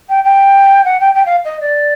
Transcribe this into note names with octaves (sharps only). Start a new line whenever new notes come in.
G5
G5
F#5
G5
G5
F5
D#5
D5